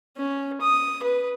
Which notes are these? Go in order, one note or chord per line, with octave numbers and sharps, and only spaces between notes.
C#4
D#6
B4